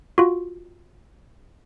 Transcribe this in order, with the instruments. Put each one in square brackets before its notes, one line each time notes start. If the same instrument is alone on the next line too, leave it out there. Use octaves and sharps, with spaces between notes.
[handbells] F4 F#4